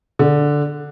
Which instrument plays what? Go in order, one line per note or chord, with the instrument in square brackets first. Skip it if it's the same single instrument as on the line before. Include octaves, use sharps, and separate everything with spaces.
[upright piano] D3